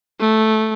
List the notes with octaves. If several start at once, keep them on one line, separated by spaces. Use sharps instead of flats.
A3